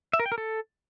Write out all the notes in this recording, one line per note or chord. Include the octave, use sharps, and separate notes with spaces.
E5
A#4
G5
A#4
A4